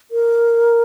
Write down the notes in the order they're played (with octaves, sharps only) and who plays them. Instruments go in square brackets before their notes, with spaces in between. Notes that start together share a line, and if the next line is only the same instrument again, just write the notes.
[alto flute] A#4